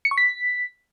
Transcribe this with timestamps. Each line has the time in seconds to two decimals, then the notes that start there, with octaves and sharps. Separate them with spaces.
0.05 C#7
0.11 C#6
0.18 B6